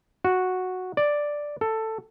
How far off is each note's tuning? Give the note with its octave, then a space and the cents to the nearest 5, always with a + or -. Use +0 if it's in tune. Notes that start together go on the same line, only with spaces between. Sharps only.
F#4 -5
D5 +0
A4 +10